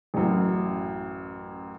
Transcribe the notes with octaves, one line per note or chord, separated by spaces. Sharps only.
A1 F#2